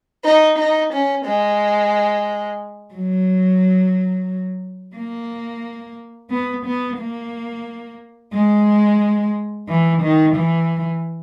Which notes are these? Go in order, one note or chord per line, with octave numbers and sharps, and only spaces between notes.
D#4
D#4
C#4
G#3
F#3
A#3
B3
B3
A#3
G#3
E3
D#3
E3